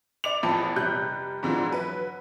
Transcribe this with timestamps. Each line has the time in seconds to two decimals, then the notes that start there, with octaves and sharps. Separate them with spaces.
0.24 D5 D6 F7
0.43 A1 E2 A2 E3 F3 A5
0.76 F1 G3 F#6 G6
1.43 G#2 D3 E3 F3
1.69 F#3 B4